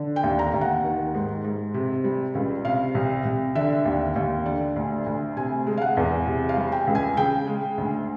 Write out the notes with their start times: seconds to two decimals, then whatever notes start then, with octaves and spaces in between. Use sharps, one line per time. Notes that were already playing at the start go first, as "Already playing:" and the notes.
Already playing: D3
0.16 G5
0.24 D#2
0.39 A#5
0.54 D#2
0.61 F#5
0.84 D#3
1.14 G#2
1.44 G#2
1.74 C3
2.04 G3
2.35 C#2
2.65 C3 F5
2.95 C2
3.25 C2
3.55 D3 E5
3.86 D#2
4.16 D#2
4.46 D3 D5
4.76 D2
5.06 D2
5.36 C3 G#5
5.67 G#3
5.77 F5
5.82 F#5
5.97 E2
6.27 C3
6.49 F5
6.57 G3
6.72 G5
6.87 C#2
6.95 G#5
7.17 C#3 G5
7.47 G#3
7.78 D2